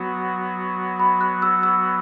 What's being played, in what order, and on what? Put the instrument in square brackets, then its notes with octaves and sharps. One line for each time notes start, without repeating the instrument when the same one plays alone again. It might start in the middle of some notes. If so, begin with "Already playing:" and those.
Already playing: [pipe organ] F#3 B3 F#4
[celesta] B5
F#6
E6
E6